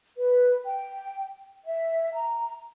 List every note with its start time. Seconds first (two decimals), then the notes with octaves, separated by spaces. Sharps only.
0.17 B4
0.65 G5
1.65 E5
2.14 A#5